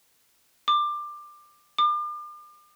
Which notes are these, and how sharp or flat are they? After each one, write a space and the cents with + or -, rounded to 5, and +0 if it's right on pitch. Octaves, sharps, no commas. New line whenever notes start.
D6 +20
D6 +40